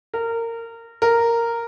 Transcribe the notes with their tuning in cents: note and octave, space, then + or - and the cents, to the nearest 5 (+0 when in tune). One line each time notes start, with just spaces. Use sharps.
A#4 -20
A#4 -5